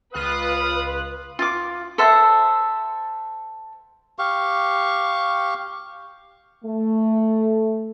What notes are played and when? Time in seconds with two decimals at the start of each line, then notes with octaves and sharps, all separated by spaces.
0.14 C#2 F4 B4 F5 D#6 F#6
1.39 F4 D6
1.98 A4 C5 E5 F#5
4.19 G4 F5 C#6
6.65 A3